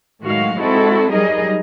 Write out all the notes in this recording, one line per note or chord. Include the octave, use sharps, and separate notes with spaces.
A2 D#3 F#3 G#3 F#4 F5
G#3 C4 D#4 E4 F#4 A4
F#3 G3 D#4 G#4 A#4 D#5